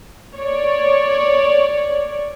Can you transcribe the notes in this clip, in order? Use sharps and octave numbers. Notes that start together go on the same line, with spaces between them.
C#5 D5